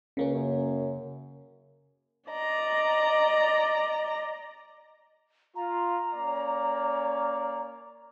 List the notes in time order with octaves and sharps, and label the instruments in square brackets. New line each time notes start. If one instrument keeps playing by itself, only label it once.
[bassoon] C#2 [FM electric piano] C#3 A#3 C#4
[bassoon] F#2
[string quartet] D5 D#5 A#5
[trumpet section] F4 [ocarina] A#5
[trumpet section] A#3 C#4 D5